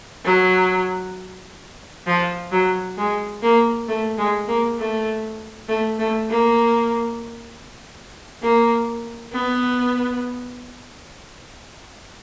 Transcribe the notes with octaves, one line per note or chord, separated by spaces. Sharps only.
F#3
F3
F#3
G#3
A#3
A3
G#3
A#3
A3
A3
A3
A#3
A#3
B3